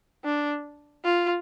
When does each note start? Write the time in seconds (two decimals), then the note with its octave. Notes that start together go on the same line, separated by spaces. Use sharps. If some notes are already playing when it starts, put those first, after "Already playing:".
0.25 D4
1.05 F4